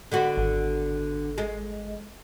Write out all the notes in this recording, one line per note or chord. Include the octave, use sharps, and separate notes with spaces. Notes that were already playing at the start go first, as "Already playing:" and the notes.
D3 B3 F#4
G#1
G#3